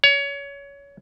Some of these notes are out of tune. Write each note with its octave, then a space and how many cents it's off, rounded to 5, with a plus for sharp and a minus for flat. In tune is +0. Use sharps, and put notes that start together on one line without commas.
C#5 +25